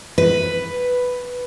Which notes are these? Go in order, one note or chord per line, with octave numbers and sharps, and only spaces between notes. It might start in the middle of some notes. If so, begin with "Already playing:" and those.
B4